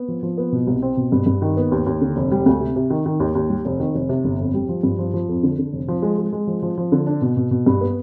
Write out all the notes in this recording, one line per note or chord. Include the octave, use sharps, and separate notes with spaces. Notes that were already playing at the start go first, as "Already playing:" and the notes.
Already playing: B3
F3
F3
B3
B2
C2
C4
B2
G2
G2
D#3
B3
D#2
D#2
D3
F1
G3
D2
C3
C3
D#3
D#3
D#2
D#2
G3
F1
D#3
F1
C3
G1
F2
G3
F3
G2
F3
F3
F2
D3
D3
F1
F3
G#3
G#3
G#3
F3
F3
F3
D3
D4
B2
B2
B2
G2
B3